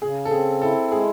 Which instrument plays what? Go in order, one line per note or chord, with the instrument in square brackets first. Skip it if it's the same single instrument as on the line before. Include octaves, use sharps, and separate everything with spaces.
[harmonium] C#3 [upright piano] G#4
[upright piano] A4
[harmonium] C4 [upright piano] G#4
[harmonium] E4 [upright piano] A4
[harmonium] G#3 [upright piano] G#4